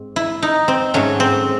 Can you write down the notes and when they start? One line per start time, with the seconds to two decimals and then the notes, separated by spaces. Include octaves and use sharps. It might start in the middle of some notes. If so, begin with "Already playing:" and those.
Already playing: G#2 C4
0.16 E4
0.42 D#4
0.68 C4
0.94 G#2 F#3 A3 C#4
1.20 C4